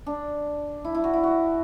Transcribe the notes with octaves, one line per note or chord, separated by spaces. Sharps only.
D4
E4
E4
F#4
E4
F#4